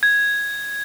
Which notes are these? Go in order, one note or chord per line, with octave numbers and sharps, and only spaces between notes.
G#6